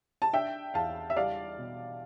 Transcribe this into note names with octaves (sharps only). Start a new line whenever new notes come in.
A5
D4 E5 G5
E2 F5 A5
E5
G3 D5 F5
B2